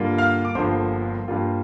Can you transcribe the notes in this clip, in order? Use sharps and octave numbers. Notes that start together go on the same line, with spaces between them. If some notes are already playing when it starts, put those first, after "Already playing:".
Already playing: G2 D3 G3 A#3 F4
F5 F6
D6
G1 G2 D3 F3 A#3 C5 C6
G2 G3 A#3 F4